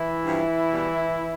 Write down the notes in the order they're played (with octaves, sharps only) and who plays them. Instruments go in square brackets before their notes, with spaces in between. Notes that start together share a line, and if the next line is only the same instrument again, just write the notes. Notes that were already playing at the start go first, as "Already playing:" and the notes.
Already playing: [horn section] E3 E4
G2 F3
B2 G3